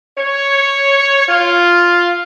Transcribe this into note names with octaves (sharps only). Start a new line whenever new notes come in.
C#5
F4